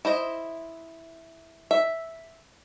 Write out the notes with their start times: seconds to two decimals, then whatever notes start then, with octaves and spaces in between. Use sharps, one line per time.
0.05 E4 C5 D#5
1.71 E5